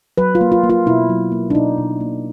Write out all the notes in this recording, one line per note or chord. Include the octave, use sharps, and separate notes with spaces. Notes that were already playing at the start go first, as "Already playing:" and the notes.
F#3 B4
F4
A#3
F4
A#3
F4
B2 E4
F#3
A#3
D4
B2 D#4
B2
A#3